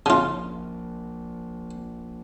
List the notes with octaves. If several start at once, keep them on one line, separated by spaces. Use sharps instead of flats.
A#1 C#3 F4